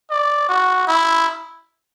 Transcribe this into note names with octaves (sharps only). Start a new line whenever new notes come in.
D5
F#4
E4